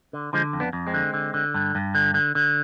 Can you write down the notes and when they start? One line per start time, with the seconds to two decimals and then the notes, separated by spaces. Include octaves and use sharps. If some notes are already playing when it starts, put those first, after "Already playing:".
0.13 D3
0.33 D3 F3 G#3
0.53 F2
0.60 B3 D4
0.73 F2
0.87 G#3 C4
0.94 D3
1.14 D3
1.34 D3
1.54 G2
1.75 G2
1.95 D3
2.14 D3
2.35 D3